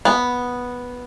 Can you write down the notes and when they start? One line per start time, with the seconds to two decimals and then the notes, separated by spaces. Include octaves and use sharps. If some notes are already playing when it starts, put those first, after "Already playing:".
0.05 B3